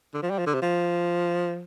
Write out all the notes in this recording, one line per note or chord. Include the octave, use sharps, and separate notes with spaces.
D3
F3
G3
F3
D3
C3
F3